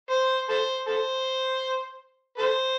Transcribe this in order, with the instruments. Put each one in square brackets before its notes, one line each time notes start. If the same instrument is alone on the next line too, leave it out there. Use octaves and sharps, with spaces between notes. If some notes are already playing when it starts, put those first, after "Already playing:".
[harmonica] C5
A4 C5
A4 C5
A4 C5